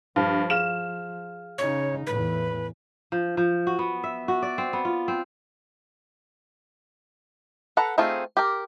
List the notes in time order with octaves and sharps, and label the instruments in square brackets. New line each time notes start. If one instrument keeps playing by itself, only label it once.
[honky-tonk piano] G2 [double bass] F3 [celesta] C5 A5 F6
[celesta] G#4 F5 F6 [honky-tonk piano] E7
[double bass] C#3 D#4 [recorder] C#5
[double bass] E2 A2 [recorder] B4
[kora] F3
F3
F#4
B3
E5
F#4
D5
C4
B3
F4
C4
[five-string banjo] A4 B4 F#5 A#5
A3 C4 D#4 F4 G#4
G4 A#4